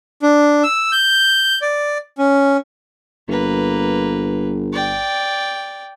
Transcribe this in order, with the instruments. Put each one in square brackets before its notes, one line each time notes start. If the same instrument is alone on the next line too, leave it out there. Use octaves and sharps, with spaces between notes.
[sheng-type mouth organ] D4
E6
G6
D5
C#4
[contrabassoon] G1 [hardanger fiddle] A#3 B4
[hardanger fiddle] D5 G5